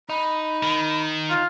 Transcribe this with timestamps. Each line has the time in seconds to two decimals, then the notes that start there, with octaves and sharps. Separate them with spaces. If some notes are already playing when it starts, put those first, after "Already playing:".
0.09 D#4 B5
0.63 D#3
1.30 F4